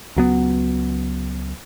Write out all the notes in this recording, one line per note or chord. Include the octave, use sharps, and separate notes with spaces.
C#2 F#3 B3